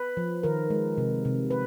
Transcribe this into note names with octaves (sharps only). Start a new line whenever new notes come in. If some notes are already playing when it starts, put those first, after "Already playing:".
Already playing: B4
F3
D#3 A#4
G#3
C3
C3
B4